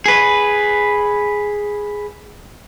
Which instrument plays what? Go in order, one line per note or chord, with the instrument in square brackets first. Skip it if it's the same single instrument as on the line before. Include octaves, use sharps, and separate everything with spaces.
[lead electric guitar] G#4 B4